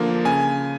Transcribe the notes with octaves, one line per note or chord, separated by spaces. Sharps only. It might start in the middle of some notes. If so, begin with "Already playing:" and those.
Already playing: D3 F3 A#3
C#3 G#5